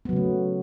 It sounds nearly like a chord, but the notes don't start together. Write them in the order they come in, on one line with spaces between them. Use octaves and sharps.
B3 F#3 C#3 A3